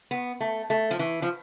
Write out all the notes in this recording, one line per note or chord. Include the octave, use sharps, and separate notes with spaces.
B3
A3
A3
F3
E3
F3